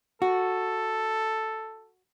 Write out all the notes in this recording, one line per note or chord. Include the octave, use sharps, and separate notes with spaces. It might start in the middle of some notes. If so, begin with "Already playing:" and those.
F#4 A4